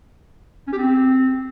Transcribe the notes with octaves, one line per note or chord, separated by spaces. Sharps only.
C#4
G4
C4